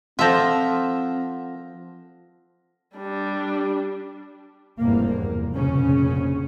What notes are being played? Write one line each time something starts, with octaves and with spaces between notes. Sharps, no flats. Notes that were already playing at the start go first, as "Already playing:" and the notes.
F3 C4 F4 A4 E5 F#5 A#6
G3 D4
F1 E2 G2 A#3
F1 A#1 A#2 C#3 C#4